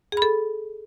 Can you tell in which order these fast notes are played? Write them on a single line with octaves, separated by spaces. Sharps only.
G#4 B5 A4